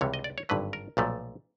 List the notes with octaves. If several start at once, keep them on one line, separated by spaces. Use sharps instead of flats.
C#2 C3 E3 G3 C#5
D#5
D5
C#5
G#1 G2 D3 F#3 B4
A#4
B1 A#2 F3 A3